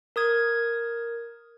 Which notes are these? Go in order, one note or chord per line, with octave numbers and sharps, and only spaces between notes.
A#4 D#6 G#6